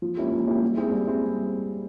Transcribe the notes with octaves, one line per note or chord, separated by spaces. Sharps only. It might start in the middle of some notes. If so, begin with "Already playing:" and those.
F3
A#3 C#4 E4 G4
F3
A#3 C#4 E4 G4
G3
C4 E4 G#4
G3
C4 E4 G#4